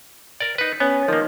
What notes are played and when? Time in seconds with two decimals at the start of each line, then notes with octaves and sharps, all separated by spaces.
0.40 A#4 D5
0.58 D#4 B4
0.80 B3 C#4
1.08 D#3 F3 A#3